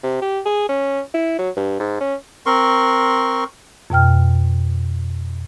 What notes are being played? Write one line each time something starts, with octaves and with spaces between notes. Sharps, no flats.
C3
G4
G#4
C#4
E4
F#3
G2
G#2
C#4
C4 A#4 C6 C#6
F2 B2 G5 F6